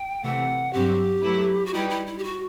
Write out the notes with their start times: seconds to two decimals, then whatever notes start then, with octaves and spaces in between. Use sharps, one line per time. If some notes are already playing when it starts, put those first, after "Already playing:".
Already playing: G5
0.23 C3 E3 A3 F#5
0.73 G2 F#3 C4 F#4 G4
1.23 F#3 A3 E4 B4
1.66 F#4
1.73 G3 D#4 E4 G4 B4
1.90 E4
2.07 E4
2.18 G4
2.24 F#4